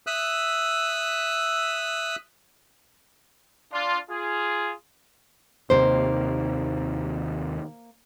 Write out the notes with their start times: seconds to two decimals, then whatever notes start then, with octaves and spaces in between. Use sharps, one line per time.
0.07 E5 D#6 E6 F#6
3.73 D4 F4
4.10 F4 G#4
5.70 D#2 C3 D#3 A#3 C5